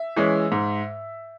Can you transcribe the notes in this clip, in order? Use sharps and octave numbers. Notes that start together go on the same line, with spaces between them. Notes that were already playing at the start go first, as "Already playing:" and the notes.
Already playing: E5
E3 G#3 C#4
G#2